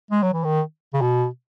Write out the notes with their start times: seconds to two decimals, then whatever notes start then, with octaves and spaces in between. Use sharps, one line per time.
0.11 G#3
0.23 F#3
0.33 E3
0.44 D#3
0.94 C#3
1.02 B2